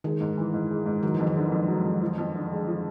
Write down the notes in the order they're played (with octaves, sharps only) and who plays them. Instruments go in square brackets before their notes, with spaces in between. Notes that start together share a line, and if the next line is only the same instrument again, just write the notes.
[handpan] D#3 [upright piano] G#3
[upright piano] G#2
E3
G#2
G#3
G#2
[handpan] D#3 [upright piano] F#3
[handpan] E3
[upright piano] F2
[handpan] D#3
[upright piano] D3
F2
F#3
F2
F3
F2
D3
G#3
F3